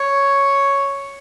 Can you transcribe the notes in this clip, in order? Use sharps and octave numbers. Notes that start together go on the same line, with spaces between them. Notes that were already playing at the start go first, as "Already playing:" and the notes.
Already playing: C#5